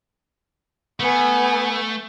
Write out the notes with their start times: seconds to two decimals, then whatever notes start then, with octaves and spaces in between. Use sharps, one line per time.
1.00 A3 B3 G#5